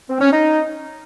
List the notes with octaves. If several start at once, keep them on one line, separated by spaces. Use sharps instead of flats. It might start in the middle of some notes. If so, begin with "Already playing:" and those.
C4
C#4
D#4